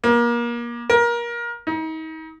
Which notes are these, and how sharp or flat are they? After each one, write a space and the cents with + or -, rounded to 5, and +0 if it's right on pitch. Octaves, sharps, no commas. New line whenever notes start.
A#3 +30
A#4 +25
D#4 +35